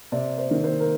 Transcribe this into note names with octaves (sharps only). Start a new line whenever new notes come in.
C3 D5
C5
D#3
C5
A#4